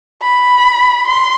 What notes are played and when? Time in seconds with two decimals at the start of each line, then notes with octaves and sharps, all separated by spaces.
0.22 B5
1.07 C6